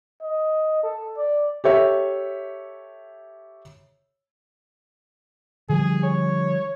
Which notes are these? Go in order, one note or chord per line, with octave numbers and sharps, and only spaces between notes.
D#5
A4
D5
G4 A4 C#5 E5
D3 F3 G3 G#4
C#5